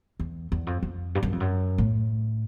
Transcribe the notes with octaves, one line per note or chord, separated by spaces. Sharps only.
E2
E2
F2
F2
G2
F#2
F2
F#2
A2